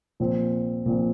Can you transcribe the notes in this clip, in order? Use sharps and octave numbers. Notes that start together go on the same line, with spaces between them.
A#2 F3 C4
A#2 F3 C4